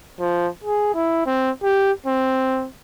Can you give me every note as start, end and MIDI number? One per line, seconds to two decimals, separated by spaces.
0.19 0.48 53
0.64 0.91 68
0.94 1.23 64
1.26 1.50 60
1.63 1.91 67
2.06 2.67 60